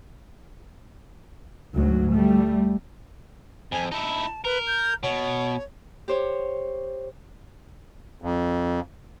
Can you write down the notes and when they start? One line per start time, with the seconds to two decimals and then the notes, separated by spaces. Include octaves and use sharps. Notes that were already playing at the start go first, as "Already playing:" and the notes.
1.75 D2 G#2 F#3
2.13 G3 A3
3.72 F2 G#5
3.92 D#4 E4 A5
4.45 A#4 B4
4.67 G6
5.03 B2 C#5
6.08 G4 C5 C#5
8.22 F2